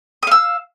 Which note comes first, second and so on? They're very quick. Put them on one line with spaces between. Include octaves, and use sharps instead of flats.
D#6 F5 E6